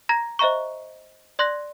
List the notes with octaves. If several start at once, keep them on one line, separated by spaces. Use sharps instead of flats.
A#5 G#6 A#6
C5 D#5 E5 A#5 C#6
D5 C6 F#6 A#6